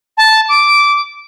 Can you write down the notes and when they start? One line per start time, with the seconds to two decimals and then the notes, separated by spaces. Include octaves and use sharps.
0.17 A5
0.49 D6